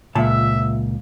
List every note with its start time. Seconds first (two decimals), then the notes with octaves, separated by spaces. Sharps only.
0.15 C#2 A#2 E5 A5